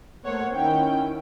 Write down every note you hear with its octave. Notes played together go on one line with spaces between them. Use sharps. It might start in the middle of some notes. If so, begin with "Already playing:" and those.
A3 A#3 C5 C#5 F#5
D#3 C#4 E4 G5